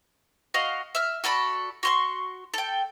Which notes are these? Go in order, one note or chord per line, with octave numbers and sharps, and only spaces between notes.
F#4 D#5 F5
E5 F6
F#4 A4 D5 B5
F#4 C6 C#6
A4 G5